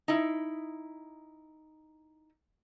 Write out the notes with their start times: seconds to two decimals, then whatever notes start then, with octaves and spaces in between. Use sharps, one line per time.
0.08 D#4 E4